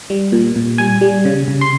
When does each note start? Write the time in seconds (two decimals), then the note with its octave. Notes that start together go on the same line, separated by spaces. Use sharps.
0.10 G3
0.32 A#2
0.56 A#2
0.78 G3 G#5
1.01 G3
1.25 C#3
1.48 C#3
1.61 C6